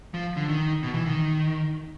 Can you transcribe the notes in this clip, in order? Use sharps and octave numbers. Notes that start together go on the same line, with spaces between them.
F3
D3
D#3
B2
E3
D#3